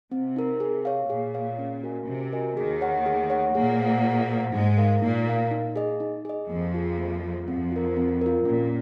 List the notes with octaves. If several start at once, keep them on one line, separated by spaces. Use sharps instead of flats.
C3 C4
D#4 A#4
G#4
C#5 F5
A#2 G#4
C#5 F5
C#4
F#4 A#4 D#5 G#5
C3 C#4
F#4 A#4 D#5 G#5
D#2 D#3 G#4
C#5 F#5
G#4
C#5 F#5
A#2 A#3 G#4
C5 F#5
G#4
C5 F#5
G#2 G#3 D#4
A#4 F5
A#2 A#3 D#4
A#4 F5
D#4
G#4 D#5
D#4
G#4 D#5
F2 F3 A#3
F4 G#4
A#3
F4 G#4
F2 F3 C4
F4 A#4
C4
F4 A#4
A#2 C#4